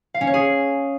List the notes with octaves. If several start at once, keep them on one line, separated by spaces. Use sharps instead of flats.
F5
C#4
C#5
G#4